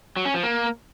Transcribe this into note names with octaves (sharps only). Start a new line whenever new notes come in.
F#3
C#4
F3
A#3